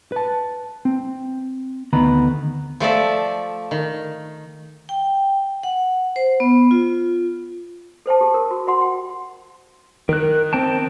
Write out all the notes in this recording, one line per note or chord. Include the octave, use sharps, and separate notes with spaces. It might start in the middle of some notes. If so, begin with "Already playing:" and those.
B4 A5
C4
D2 D#3 B3 A#5 B5
F3 A3 D5 E5
D#3
G5
F#5
C5
B3
F4
A4 C5 G5 A5
G4 G#4
A#4
F#4
F#4 F#5 C6
G5
D#3 A#4 F#6
C4 G5 A5